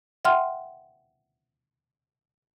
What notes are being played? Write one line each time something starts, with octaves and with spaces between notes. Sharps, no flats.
E5 F#5 G5 C6 F6